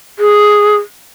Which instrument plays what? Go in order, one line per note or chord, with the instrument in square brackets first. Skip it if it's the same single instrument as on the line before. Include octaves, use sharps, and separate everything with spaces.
[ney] G#4